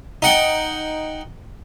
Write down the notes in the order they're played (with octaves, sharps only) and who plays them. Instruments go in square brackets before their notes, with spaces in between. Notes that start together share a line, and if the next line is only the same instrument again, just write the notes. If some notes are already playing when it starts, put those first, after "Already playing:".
[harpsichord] D#4 F#5 G5